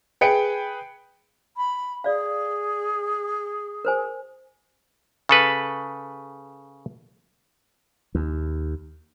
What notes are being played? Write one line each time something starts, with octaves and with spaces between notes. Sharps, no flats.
G#4 B4 G5 C#7 D7
B5
G#4 D5 F5
A#4 C5 G#5
C#3 A4 B4
D#2